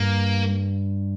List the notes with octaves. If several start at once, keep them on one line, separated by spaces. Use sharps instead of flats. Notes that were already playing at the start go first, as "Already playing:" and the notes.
Already playing: G2 A#3